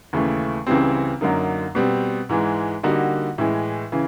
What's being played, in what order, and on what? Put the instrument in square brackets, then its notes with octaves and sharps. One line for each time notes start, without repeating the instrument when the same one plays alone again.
[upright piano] D#2 C#3 E3 A3
C#2 C#3 E3 G3 C4
F#2 D3 F#3 A#3 D#4
B2 G3 C4
G#2 E3 G#3
D3 G3 A#3 D#4 F#4
A2 E3 G#3
C#3 E3